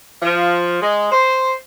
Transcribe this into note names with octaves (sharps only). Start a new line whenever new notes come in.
F3
G#3
C5